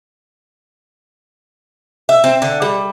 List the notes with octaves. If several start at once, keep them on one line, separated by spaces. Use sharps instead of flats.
E5
C4
D3
G3